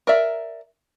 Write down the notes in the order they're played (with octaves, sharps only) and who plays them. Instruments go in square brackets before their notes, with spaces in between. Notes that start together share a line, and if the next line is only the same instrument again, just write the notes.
[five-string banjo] A#4 D5 E5